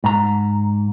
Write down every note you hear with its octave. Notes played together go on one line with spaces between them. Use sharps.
G#2 A#5